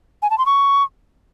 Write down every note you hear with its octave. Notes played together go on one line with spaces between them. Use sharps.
G#5
A5
C6
C#6